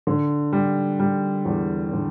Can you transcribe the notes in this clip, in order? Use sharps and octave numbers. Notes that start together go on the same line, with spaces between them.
D3
G3
G3
E2
D3